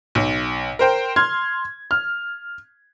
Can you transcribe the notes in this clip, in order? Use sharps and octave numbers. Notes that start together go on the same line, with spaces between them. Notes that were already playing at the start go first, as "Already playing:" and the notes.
B1
A#4 C5 G5
C6 F6 G#6
F6